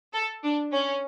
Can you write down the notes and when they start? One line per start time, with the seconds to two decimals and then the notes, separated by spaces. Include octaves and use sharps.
0.14 A4
0.44 D4
0.72 C#4